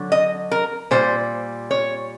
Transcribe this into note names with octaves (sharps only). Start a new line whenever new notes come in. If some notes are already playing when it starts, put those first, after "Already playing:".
Already playing: D3 F#3
D#5
A#4
A#2 G3 C5
C#5